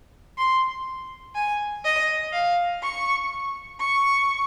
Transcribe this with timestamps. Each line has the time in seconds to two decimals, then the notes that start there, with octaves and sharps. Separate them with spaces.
0.38 C6
1.35 G#5
1.85 D#5
2.33 F5
2.83 C#6
3.80 C#6